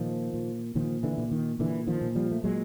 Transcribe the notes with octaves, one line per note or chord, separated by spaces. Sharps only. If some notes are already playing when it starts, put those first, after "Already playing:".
Already playing: A#2 D#3 F3
A#2
A#2 D#3 F3
D3 E3
A#2
D#3
A#2 D3 E3
D#3 F3
A#2
F3 G3
A3
A#2 F#3 G#3